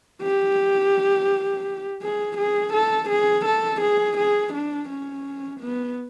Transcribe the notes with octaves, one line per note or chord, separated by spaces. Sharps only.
G4
G#4
G#4
A4
G#4
A4
G#4
G#4
D4
C#4
B3